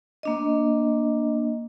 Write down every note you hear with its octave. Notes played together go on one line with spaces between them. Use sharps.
A#3 D4 D#5